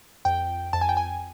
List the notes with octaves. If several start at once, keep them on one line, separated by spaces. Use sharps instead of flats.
F2 G5
F2 A5
G#5
G5
G#5